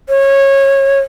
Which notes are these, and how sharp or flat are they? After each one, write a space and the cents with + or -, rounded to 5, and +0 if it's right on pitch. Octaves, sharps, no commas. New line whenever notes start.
C#5 -20